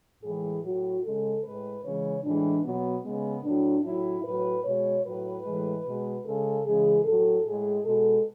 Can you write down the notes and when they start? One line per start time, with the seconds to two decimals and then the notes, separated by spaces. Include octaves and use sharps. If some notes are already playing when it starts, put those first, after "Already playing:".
0.23 A2 E3 G#3 G#4
0.63 A2 F#3 F#4
1.03 C#3 G#3 A4
1.43 A2 G#3 B4
1.84 C#3 E3 G#3 C#5
2.23 A2 E3 G#3 D4
2.64 B2 F#3 B3
3.03 C#3 G#3 B3
3.44 A2 F#3 D4
3.84 A2 F#3 E4
4.24 A2 F#3 B4
4.64 B2 G#3 C#5
5.04 A2 F#3 B4
5.44 A2 E3 G#3
5.84 B2 G#3
6.25 C#3 G#3 A4
6.65 C#3 E3 G#3 G#4
7.05 A2 F#3 A4
7.45 A2 G#3 G#4
7.85 B2 G#3 A4